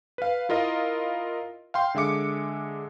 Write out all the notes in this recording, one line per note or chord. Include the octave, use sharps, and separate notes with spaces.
B4 F5
E4 F4 A#4 D#5 F5
F5 G5 C6
D3 G#3 E5 D6 C#7